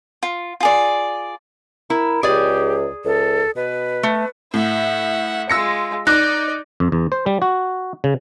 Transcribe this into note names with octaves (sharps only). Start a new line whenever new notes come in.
F4
F4 G#4 D5
E4 A#4
C#2 G4 G#4 D5
C#2 A4
B2 B4
A3
A2 E5 F#5
G#3 F4 E6 A#6 C#7
D#4 D5 D6 F#6 A#6
F2
E2
C5
G3
F#4
C#3